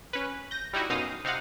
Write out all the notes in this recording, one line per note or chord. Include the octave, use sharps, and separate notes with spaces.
C#4 B4
G6 A#6
G3 D#4 E4 F#4
B1 F#2 D#4 F5 D#6
C3 D#4 F5 F#5